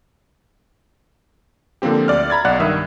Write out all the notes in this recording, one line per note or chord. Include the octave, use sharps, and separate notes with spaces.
D3 F3 A#3 C4 G4
D2 D5 F6
A#5 B5 G#6 A6
B1 D5 F#5 F#6
G2 D#3 E5 D#6 E6